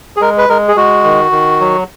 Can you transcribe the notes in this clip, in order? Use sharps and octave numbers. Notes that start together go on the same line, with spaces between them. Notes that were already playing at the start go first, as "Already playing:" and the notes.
G#4
G#3 A#4
B4
G#3 A#4
G#4
G#3 F#4
D#3
D#3
F#3